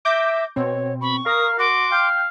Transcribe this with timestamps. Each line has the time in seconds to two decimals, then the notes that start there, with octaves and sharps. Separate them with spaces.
0.05 E5 D6 G6 A#6
0.56 B2 C4 C#5
1.01 B5 C#6
1.26 A#4 F5 D#6
1.59 F#4 C6 D6
1.92 F5 G5 G6